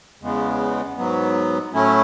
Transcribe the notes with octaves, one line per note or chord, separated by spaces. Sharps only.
E2 C#3 G#3 B3
G#2 F#3 B3
A2 F#3 A3 C#4 E4